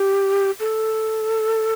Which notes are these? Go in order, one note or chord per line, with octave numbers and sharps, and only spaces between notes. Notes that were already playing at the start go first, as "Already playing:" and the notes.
Already playing: G4
A4